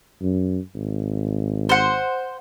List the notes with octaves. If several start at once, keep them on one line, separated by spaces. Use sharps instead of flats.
F#2
G#1
C5 F#5